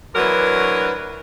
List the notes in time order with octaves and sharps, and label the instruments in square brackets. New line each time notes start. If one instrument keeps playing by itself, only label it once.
[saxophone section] D2 E3 F#3 D4 A#4 B4